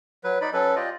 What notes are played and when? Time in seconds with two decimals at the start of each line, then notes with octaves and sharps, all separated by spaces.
0.24 F#3 B4
0.41 D#4 D5 B5
0.53 F#3 C#4 A4 B4
0.76 F4 G4 D5 D#5